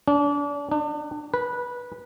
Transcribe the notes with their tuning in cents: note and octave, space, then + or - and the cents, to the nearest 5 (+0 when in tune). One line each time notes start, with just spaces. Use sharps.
D4 -35
D4 +35
B4 -15